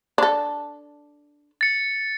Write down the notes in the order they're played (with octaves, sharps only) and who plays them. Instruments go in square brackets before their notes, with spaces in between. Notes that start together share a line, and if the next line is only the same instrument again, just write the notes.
[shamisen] D4 A4
[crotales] A6 C#7